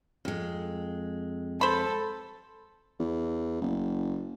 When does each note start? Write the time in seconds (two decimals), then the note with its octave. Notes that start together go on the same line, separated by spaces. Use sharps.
0.25 F2 G#3
1.61 A4 C5 B5
2.99 E2
3.61 F#1